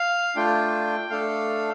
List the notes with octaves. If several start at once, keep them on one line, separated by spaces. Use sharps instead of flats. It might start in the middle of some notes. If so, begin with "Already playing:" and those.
Already playing: F5
A3 D4 F4 G5
A3 D4 A4 F5